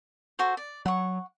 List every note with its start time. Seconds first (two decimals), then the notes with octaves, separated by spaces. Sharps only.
0.39 F#4 A4 C5
0.57 D5
0.86 F#3 F#5 C#6